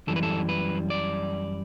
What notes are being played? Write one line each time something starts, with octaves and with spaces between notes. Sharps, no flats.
F#2 E3 G3 A4
B4
A4
B4
D5